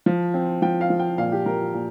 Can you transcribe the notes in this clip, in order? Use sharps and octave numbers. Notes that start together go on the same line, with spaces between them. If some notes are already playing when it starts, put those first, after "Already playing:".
F3
C4
F3 G5
F5
F3
G5
A#2 F5
G4
F3 A#4
A#2